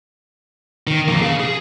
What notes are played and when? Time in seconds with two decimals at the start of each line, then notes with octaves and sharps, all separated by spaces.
0.87 D#3
1.07 F2 A#3
1.22 G#4 F5
1.40 G#4